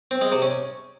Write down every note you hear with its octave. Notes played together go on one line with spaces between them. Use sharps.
C4
G#3
C3
C#4